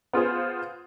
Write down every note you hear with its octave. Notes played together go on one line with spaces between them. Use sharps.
B3 F4 G#4 C5